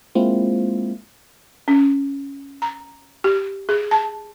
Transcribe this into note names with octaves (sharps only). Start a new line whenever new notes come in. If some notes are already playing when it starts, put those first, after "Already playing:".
G#3 A#3 C4 E4 F4
C#4
A#5
G4
G#4
A5